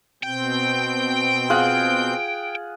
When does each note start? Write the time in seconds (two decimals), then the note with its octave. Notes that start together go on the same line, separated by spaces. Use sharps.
0.23 B2 C4 G5 G6
1.50 F4 G#4 F#5